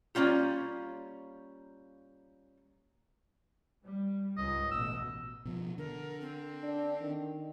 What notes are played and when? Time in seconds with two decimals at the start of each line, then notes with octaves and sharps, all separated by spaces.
0.15 G3 A#3 C#4 F4 G4
3.84 G3
4.37 C#2 G#2 D#5
4.71 A1 B2 E6
5.45 B2 F3
5.78 D3 A#4
6.21 C4
6.63 D4
7.02 D#3